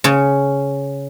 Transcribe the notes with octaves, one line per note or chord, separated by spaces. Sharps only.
C#3 C#4